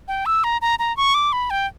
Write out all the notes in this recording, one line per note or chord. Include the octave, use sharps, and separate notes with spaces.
G5
E6
A#5
A#5
A#5
C#6
D6
B5
G5